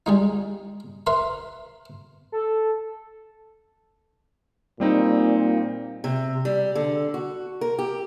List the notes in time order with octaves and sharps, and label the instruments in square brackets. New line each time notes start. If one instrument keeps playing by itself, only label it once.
[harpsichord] G3 G#3 D#4
A#4 B4 E5 C6
[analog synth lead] A4
[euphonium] A#2 [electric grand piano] G3 C4 D#4
[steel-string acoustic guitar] C3
G3
D3
F#4
A#4
G4